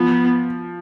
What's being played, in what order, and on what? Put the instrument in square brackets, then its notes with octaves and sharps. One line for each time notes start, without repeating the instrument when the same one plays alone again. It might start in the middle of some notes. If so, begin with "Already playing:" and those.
Already playing: [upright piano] F3 [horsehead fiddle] B3